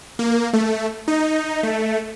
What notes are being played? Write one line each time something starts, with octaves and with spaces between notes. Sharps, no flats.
A#3
A3
D#4
A3